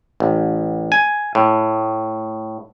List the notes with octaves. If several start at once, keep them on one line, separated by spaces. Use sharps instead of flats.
A1
G#5
A2